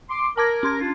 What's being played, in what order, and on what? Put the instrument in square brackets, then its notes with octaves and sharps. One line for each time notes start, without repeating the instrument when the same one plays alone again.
[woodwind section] C6 D6
[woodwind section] A#4 [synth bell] A5 D6 G#6
[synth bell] C#4 C6 G#6
[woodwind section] D4 F4